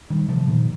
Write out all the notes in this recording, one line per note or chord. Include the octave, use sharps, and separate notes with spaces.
D#3 G3
C3 F3
A#2 D#3